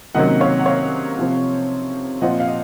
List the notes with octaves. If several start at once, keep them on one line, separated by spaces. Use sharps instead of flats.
C3 D#3 F#3 A#3 C#4 D#5 F#5
C#5 F5
F#5
C#5 F5
C3 F3 C4
A#2 F3 C4 F4 D#5 F#5
F5
D#5